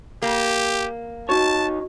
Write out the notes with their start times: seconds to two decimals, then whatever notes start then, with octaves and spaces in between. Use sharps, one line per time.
0.22 A#3 G4
1.29 D#4 F#4 C#5 A5